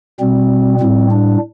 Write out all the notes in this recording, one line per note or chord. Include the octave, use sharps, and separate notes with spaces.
B2 G3 C4
A2 G3 C4
D4